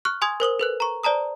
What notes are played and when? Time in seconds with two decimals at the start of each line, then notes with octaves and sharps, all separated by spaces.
0.05 C#6 F6 F#6
0.22 G#5 C6 D#6 G#6
0.40 A#4 C5 D#6 F#7
0.59 A4 B4 F#6
0.80 A#5 C#6
1.03 C5 D5 A5 A#5 D#6